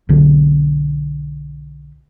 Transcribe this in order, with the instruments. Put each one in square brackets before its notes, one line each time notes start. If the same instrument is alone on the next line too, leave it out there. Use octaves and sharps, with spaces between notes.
[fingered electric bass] B1 D3